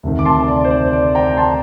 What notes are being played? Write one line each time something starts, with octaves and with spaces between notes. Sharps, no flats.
D2 C3 D#3
D6
A5 C6
D5
C5
D5
D5
G5 A#5
A5 C6